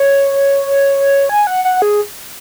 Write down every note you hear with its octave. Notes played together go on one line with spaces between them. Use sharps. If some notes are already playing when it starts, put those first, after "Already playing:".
Already playing: C#5
G#5
F#5
F#5
G#4